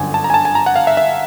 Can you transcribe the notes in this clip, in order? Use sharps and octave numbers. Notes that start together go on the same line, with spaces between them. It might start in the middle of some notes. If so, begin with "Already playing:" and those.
Already playing: G1 F#2 D3 G#5
A5
A#5
G#5
A5
G#5
A#5
F#5
F5
E5
E5